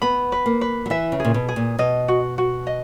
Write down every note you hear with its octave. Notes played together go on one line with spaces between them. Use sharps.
B3 B5
B4
A#3
B4
F#3
E3 E5
C#3
A#2 G#4
B2
G#4
A#2
B2 D#5
F#4
F#4
D#5